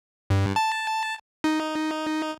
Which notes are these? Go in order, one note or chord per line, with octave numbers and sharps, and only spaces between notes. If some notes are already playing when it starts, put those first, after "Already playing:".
G2
A5
D#4